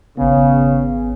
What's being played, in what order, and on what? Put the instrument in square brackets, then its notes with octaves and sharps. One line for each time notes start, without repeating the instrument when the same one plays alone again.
[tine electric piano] G#1 B3 [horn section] C#3